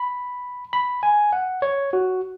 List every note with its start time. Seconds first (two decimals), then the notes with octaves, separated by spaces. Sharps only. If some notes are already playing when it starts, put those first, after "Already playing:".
Already playing: B5
0.73 B5
1.03 G#5
1.33 F#5
1.62 C#5
1.93 F#4